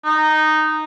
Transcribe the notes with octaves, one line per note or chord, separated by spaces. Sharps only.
D#4